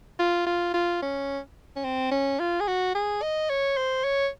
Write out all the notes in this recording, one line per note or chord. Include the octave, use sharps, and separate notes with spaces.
F4
F4
F4
C#4
C#4
C4
C#4
F4
G#4
F#4
G#4
D#5
C#5
C5
C#5